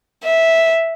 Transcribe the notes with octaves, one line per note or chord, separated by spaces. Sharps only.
E5